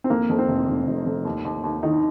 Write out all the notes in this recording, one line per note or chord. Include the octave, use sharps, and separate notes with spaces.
C4
F2 A#3
F2
C4
F1
F1
F1
F2
D#2
D#2
D#2
D#3 D#4